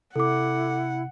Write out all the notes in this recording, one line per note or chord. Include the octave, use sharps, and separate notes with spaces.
C3 E4 A4 F#5 D6